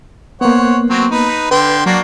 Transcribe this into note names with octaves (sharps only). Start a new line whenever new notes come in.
A#3 B3 C5 C#5 F#5
F#3 C4 F#4
D#4 B4
D3 B4 G5 C6
F#3 A#3 D4 F#4